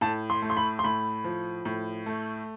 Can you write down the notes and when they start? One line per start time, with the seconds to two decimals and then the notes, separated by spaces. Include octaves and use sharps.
0.01 A2 A5
0.30 C6
0.42 A3
0.50 C6
0.57 B5
0.79 C6
0.84 A2 B5
1.24 F3
1.65 A2
2.06 A3